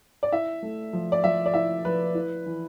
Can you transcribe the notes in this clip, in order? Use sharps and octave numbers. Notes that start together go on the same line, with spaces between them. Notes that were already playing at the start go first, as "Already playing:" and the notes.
D5
E4 E5
A3
F3
D5
F3 E5
D5
E4 E5
F3 B4
E4
E3